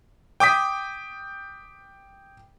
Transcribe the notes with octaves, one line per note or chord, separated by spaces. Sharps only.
G5 D6 D#6 B6